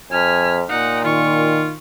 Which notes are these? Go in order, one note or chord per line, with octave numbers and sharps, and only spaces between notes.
F2 G#5 F6 B6
A#2 D#4 F#5
D#3 F4 C#6